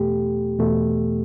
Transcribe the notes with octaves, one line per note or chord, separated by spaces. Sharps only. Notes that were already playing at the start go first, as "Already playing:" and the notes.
Already playing: E2 B2 A3 G4
E2 B2 A3